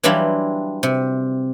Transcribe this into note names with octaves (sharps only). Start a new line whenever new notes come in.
E3 F#3 G3 D4 E4 F4
C3